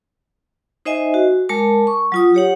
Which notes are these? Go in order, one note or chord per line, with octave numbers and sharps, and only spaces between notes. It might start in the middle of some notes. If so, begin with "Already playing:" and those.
D#4 C5 D#5 E5 G#5
F#4
G#3 A#4 A5 D6
C#6
F#3 F4 D#6
G4 C#5 F#5